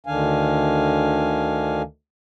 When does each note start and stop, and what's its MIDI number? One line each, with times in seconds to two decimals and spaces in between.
0.06 1.82 38
0.06 1.82 50
0.06 1.82 51
0.06 1.82 62
0.06 1.82 77
0.06 1.82 80